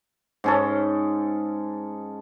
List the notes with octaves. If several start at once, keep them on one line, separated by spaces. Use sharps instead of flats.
G#2 C#4 A4